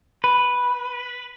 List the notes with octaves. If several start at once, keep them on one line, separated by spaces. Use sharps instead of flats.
B4